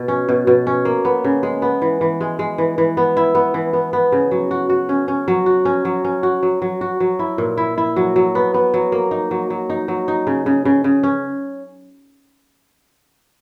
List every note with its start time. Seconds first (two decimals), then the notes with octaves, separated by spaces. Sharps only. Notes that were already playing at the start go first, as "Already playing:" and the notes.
Already playing: B2
0.08 C#4
0.29 B2
0.47 B2
0.67 C#4
0.85 A#3
1.05 B3
1.24 C#3
1.43 G#3
1.62 B3
1.82 E3
2.01 E3
2.21 G#3
2.39 G#3
2.58 E3
2.78 E3
2.97 B3
3.17 E4
3.35 B3
3.54 E3
3.73 B3
3.93 B3
4.12 C#3
4.31 F#3
4.51 F#4
4.70 F#4
4.89 C#4
5.08 C#4
5.28 F#3
5.46 F#4
5.65 C#4
5.85 F#3
6.05 C#4
6.23 F#4
6.43 F#3
6.62 F#3
6.81 F#4
7.00 F#3
7.19 E4
7.38 A#2
7.57 E4
7.78 E4
7.96 F#3
8.16 F#3
8.35 B3
8.54 B3
8.74 F#3
8.92 A#3
9.11 D#4
9.31 F#3
9.50 F#3
9.70 D#4
9.88 F#3
10.08 D#4
10.27 C#3
10.46 C#3
10.65 C#3
10.84 C#3
11.03 C#4